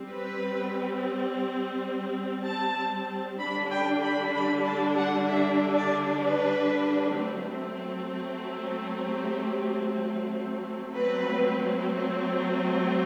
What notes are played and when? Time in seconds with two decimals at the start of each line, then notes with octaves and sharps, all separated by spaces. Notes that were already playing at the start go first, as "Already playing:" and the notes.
Already playing: G3 C4
0.09 B4
2.45 A5
3.39 D3 G3 D4 B5
3.71 G5
4.03 B5
4.34 B5
4.65 A5
4.96 F#5
5.28 E5
5.76 D5
6.22 B4
7.17 F#3 A3 C4
9.06 G4
10.94 F#3 A3 C4 B4